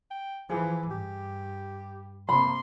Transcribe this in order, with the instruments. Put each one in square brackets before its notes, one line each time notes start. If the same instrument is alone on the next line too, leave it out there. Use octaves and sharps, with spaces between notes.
[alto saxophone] G5
[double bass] E3 [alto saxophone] F3 [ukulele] G#4
[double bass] G2 [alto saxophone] G4
[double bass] C3 A#3 [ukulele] B5 [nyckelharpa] C6